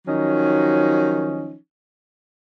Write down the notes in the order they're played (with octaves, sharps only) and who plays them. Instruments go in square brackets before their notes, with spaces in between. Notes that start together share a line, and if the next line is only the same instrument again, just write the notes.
[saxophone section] D#3 F3 F#3 C#4 D#4